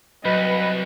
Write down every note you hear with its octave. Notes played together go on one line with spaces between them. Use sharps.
C2 F#3 B4 D#5